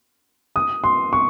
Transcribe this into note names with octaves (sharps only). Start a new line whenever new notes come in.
D#6
C6
C#6